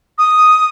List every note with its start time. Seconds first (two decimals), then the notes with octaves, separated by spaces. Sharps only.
0.18 D#6